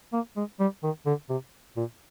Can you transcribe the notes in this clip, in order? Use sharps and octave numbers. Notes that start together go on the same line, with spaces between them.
A#3
G#3
G3
D#3
D3
C3
A#2